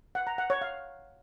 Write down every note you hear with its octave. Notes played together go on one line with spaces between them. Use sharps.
F#5
A#5
F#5
C#5
F5